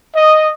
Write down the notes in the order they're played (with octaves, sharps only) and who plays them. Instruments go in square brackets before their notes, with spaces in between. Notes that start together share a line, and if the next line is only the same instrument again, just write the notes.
[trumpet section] D#5